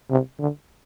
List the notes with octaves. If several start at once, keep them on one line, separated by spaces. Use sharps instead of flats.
C3
D3